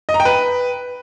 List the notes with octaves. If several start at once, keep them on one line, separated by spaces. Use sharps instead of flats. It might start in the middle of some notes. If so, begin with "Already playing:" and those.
D#5
A#5
G5
B4